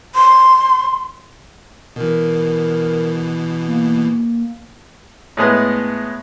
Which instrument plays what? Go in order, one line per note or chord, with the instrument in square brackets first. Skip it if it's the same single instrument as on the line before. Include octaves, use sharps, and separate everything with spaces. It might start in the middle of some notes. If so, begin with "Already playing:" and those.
[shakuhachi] C6
[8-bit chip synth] B2 E3 [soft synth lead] A#4
[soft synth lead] A#3
[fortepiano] A2 G#3 B3